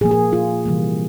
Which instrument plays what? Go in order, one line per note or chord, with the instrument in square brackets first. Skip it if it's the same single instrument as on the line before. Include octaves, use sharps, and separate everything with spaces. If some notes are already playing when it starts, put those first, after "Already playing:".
[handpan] A#2 F3 A#3 G#4
G#4
F4
C3 E3 G3 A#3